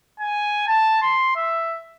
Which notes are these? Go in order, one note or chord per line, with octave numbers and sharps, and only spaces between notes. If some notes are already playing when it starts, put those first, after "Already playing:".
G#5
A5
C6
E5